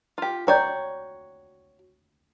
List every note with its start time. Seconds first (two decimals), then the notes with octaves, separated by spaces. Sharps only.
0.18 F4 G4
0.47 F#4 C#5 D5 G5 A#5 G6